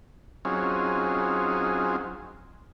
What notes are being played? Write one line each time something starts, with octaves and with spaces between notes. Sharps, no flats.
F#3 C4 C#4 D#4 F4 G#4